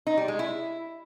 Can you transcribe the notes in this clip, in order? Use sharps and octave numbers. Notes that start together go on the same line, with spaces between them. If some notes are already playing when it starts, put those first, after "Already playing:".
D#4
G3
G#3
E4